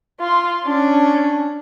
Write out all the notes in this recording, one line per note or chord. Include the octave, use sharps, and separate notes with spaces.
F4 C6
C#4 D4